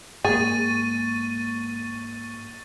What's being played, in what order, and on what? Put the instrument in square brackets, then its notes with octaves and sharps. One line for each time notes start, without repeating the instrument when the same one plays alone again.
[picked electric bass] G#2 A#3 [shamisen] G#4 [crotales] C#6 A6 D#7